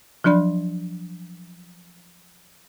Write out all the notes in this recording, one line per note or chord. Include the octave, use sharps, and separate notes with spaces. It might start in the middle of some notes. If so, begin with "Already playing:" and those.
F3 F#3 D4 D5 B5